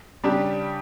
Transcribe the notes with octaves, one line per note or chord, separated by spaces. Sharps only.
C#3 G3 D4 G4